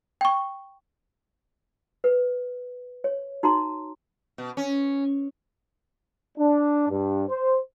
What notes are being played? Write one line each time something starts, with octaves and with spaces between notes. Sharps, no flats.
G5 C#6
B4
C#5
D#4 F#4 A#5 C6
B2
C#4
D4
G2
C5